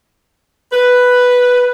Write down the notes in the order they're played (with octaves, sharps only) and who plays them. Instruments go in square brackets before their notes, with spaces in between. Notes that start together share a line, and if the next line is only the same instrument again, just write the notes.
[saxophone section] B4